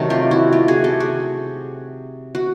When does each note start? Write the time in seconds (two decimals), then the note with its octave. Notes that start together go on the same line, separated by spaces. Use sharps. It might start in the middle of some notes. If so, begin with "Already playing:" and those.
Already playing: C3 D#3 F#3 A3
0.10 F4 G4
0.31 E4 F#4
0.53 F4 G4
0.68 F#4 G#4
0.84 G4 A4
1.00 F#4 G#4
2.35 F#4